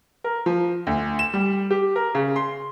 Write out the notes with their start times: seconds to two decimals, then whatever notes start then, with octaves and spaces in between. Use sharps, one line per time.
0.24 A#4
0.46 F3
0.87 D2
1.19 E7
1.34 G3
1.70 G4
1.96 A#4
2.15 C#3
2.36 C6